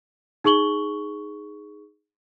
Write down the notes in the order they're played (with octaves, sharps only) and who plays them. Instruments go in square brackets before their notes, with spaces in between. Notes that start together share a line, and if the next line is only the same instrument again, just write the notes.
[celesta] D#4 G#4 C#6 F#7 G7